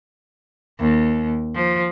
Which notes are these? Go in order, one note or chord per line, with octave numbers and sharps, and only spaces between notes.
D#2
F3